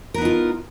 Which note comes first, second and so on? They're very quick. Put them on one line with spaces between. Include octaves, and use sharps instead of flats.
A#4 B3 D#4 F4